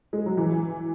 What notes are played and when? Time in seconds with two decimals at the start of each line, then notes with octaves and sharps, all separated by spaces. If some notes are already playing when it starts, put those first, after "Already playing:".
0.13 G#3
0.26 F#3
0.37 E3